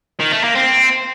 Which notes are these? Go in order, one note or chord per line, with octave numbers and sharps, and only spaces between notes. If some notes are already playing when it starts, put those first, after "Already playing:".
D#3
A3
A#3
C4